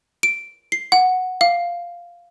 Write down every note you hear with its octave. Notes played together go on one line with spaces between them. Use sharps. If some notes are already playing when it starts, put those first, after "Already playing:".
D7
C7
F#5
F5